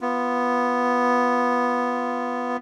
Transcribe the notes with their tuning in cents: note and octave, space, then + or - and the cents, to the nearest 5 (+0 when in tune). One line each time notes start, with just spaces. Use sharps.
B3 +0 F4 -10